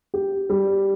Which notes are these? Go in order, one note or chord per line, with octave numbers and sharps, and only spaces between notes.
G4
G3